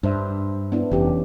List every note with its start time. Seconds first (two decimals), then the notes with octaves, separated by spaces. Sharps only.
0.03 G2 D4 C5 E5
0.72 B3 D4 E4
0.91 F1 E3 C#4 G4